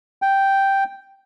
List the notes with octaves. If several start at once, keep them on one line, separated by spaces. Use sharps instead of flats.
G5